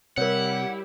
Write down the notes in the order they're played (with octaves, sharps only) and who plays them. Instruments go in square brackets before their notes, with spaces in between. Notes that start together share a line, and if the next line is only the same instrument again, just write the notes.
[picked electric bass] C3 [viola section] G3 E4 G4 [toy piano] A#4 C#5 [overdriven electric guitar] F#5